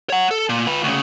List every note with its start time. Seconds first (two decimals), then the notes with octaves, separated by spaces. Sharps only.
0.10 C#5 F#5
0.31 A4
0.49 A#2
0.67 F4 B4
0.83 D2 C#3